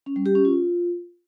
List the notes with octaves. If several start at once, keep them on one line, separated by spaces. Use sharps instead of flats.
C#4
G3
G4
C#4
F4